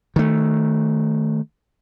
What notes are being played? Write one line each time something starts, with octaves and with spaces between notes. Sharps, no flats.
D#3 A3